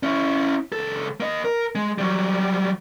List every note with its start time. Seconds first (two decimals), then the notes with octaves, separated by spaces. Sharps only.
0.03 C#4 E4
0.72 C#2 A4
1.20 A#3 D#5
1.45 A#4
1.75 G#3
1.98 F#3 G3